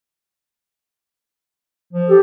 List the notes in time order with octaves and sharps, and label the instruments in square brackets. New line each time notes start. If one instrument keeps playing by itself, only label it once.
[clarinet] F3
[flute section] G4 A4